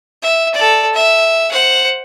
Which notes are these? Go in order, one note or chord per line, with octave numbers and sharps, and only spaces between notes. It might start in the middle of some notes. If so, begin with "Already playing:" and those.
E5
A4 D5
E5
C5 F#5